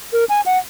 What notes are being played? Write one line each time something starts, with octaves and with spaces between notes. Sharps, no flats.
A#4
G#5
F#5